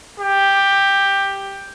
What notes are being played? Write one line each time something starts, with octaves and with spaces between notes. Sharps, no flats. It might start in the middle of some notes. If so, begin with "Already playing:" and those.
G4